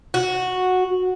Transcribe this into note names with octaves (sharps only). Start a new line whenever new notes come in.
F#4